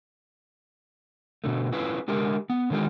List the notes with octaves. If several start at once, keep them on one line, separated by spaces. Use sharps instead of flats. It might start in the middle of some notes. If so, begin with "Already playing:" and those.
B2 D3 A3
C#4 E4 F4 G#4 B4
D3 G#3 G4 A#4
B3
D3 D#3 G#3 A3 F4 G4